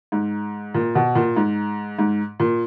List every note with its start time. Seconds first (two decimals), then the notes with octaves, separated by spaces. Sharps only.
0.12 G#2
0.74 A#2
0.95 B2
1.15 A#2
1.36 G#2
1.99 G#2
2.40 A#2